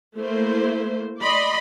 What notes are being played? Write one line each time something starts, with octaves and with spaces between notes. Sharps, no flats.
A3 A#3 E4 C5
D5 D#5 B5 C6